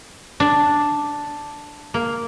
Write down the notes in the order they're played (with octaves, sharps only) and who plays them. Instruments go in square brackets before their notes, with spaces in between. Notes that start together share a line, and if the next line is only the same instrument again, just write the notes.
[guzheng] D4
A#3